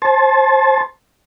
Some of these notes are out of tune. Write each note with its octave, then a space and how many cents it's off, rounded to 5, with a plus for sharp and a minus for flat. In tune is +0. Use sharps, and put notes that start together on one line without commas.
C5 +25 A5 -25